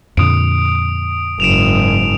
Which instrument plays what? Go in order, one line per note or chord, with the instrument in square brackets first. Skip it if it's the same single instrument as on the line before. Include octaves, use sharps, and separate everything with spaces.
[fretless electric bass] F2 A#2 D3 [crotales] D#6 D7
[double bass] F#1 G#2 [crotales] D7 E7 F7